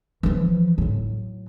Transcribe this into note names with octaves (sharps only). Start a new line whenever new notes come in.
E3 F3
A2 F#3